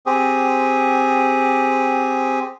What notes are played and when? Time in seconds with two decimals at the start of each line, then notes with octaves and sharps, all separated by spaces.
0.06 C4 G4 G#4